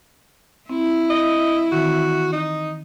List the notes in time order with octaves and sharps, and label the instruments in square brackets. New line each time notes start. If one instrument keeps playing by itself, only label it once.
[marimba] C4 [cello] E4
[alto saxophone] D#5
[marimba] D#3 E3 C4 [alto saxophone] F#4
[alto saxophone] D#4